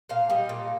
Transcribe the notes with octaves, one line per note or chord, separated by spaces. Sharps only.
A#2 F5
G3 D#5
A#2